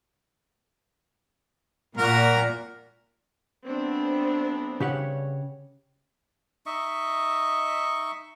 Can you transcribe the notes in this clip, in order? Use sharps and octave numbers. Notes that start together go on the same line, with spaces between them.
A#2 F#4 A#4
F#3 A3 B3 C4 D4
G2 C#3 G4 C#5 F#5
D#4 D#5 E5 C#6